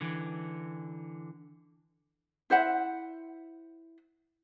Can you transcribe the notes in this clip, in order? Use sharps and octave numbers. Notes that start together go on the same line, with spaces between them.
D3 E3
E4 C5 E5 F#5